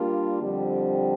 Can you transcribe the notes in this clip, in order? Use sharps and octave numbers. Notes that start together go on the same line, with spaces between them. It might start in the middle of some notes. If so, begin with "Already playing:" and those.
Already playing: G3 A#3 D4 F4
F2 D3 G3 C4 G4